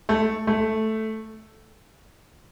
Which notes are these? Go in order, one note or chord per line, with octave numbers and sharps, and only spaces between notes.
A3
A3